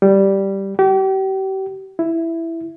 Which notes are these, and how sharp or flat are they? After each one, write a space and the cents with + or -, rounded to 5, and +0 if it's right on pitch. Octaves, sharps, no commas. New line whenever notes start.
G3 -5
G4 -40
E4 +5